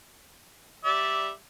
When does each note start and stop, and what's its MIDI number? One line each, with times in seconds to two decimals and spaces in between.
0.85 1.30 55
0.85 1.30 74
0.85 1.30 76